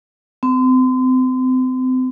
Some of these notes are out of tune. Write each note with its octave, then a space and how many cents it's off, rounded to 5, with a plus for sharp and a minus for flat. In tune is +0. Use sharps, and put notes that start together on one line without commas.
C4 -35